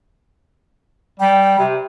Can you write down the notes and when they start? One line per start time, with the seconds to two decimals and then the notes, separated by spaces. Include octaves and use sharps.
1.20 G3 G5
1.59 C3